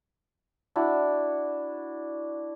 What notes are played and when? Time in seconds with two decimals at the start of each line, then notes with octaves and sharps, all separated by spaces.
0.76 D4 E4 F#4